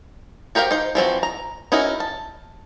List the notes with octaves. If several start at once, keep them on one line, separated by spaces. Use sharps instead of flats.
F#4 G4 A#4 C5 F5
D#4 C5
E3 F3 C4 F#4
A#5
C#4 D#4 E4 F#4 A#4
A5